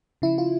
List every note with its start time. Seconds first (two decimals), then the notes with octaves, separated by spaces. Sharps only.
0.22 C#3 F3 E4
0.38 F4